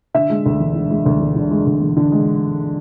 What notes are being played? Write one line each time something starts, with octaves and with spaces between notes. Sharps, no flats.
D3 E5
G#3
D2
E1
D3
G#3
D2
E1
D3
G#3
D2
E1
D3
G#3